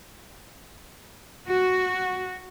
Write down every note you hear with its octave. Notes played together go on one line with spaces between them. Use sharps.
F#4